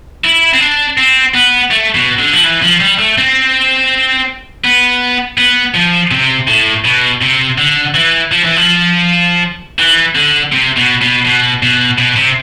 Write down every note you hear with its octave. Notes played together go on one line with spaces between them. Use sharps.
E4
C4
D4
C4
B3
A3
B2
D3
F3
E3
F3
G3
A3
C4
B3
B3
F3
C3
A2
B2
C3
D3
E3
F3
E3
F3
E3
D3
C3
B2
B2
B2
B2
B2
C3